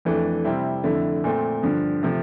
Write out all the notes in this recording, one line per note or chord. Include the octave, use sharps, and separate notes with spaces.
F2 E3 A3 D4
C3 G3 C4 E4
F2 D3 A3 E4
A#2 A3 C4
G2 D3 F3
C3 F3 A3